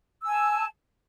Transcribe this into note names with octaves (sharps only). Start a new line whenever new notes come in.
G#5 A5 E6